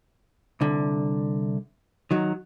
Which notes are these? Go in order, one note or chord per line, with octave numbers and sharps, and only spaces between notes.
C2 D3
D#3 F#3